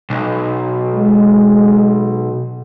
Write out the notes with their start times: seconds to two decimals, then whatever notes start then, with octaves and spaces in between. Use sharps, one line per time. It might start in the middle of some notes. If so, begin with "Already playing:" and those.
0.10 B1
0.94 G#3